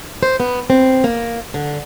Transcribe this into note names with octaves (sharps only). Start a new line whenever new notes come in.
C5
B3
C4
A#3
D3